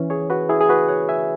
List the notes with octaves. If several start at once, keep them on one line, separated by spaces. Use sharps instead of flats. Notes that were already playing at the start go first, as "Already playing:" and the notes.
Already playing: E3 C#4
G#4 C#5
F#4 B4
E4 G#4
G#4
F#4 B4
C#5 F#5
E5 G#5